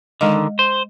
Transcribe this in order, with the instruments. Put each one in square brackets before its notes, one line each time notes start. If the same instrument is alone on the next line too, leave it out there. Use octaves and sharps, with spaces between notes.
[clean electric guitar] D3 D#3 [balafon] G#3 D#5
[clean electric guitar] C5